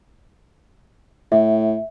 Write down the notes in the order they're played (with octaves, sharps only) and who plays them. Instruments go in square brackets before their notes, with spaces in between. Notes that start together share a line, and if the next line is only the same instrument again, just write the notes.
[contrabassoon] A2 [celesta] E5